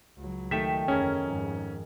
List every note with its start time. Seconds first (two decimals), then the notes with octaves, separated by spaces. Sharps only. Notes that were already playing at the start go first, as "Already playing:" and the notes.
0.17 C#2 F#3
0.51 D#3 A3 G4 B6 E7
0.88 F#1 E2 C#4 G#4 A#4
1.24 F2 G#2